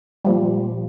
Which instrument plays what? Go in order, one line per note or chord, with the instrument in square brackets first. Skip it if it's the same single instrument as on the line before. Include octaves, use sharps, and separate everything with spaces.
[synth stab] A#2 F3 G3